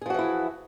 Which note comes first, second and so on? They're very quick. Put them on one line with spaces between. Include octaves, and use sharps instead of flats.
G#4 F3 F#4 E3 E4